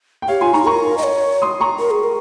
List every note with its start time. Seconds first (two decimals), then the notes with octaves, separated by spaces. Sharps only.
0.22 G5
0.28 G4 C#5 F5
0.41 F4 G#5 C6
0.53 D#4 A#5 C#6
0.66 A#4 A#5 C#6
0.98 D#5
1.03 C#5
1.42 C6 D#6
1.61 A#5 C#6
1.79 A#4
1.91 G#4
2.03 A#4